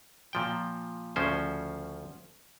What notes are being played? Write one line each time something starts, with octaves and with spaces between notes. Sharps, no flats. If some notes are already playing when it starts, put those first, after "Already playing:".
A#2 F3 G5
D2 C#3 F3 C#4 C5